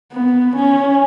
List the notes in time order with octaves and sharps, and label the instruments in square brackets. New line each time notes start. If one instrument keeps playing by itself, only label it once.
[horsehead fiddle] B3
C#4